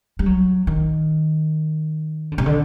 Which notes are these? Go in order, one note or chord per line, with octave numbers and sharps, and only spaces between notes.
G3
F#3
D#3
D3
C3
D3